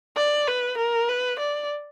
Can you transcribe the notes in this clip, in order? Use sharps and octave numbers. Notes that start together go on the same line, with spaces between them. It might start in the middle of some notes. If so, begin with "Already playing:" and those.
D5
B4
A#4
B4
D5